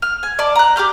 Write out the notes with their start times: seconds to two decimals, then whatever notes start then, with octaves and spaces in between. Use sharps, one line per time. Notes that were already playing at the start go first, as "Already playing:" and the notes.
0.02 F6
0.23 G#5
0.39 D5 A5
0.56 A#5 F#6
0.76 G4 D6 F6 G6